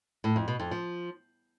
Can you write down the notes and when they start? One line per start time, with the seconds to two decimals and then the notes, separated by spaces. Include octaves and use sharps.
0.24 A2
0.36 F2
0.48 B2
0.60 F2
0.71 F3